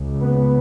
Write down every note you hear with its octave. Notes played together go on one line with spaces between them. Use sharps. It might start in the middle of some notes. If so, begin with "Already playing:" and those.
Already playing: C#2 C#3
B3